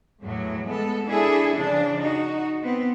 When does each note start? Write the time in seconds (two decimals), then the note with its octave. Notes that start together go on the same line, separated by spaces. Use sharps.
0.20 E2 A2 F#3
0.65 G#3 B3 A4
1.06 D4 E4 G#4 A4
1.56 C#3 F3 D4
1.99 D#4 F#4
2.62 B3 C4